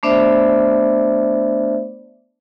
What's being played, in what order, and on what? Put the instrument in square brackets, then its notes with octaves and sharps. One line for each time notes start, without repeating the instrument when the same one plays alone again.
[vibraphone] A3 B3 D4 C5 D5 E5